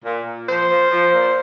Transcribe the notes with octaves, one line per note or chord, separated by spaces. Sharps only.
A#2
A#2
F3 C5
F3
F3
A#2